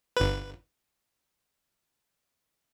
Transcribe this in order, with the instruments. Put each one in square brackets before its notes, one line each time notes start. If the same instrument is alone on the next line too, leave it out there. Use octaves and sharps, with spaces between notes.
[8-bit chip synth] G1 B4